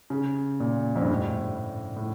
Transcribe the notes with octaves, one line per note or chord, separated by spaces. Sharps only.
C#3
A#2
F2
G2
A2
A2